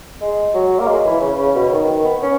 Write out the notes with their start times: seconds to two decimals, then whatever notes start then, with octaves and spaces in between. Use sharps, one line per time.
0.21 G#3
0.54 F#3
0.79 A#3
0.88 G#3
1.05 E3
1.21 C#3
1.39 C#3
1.55 B2
1.72 D#3
1.88 D#3
2.04 B3
2.22 C#4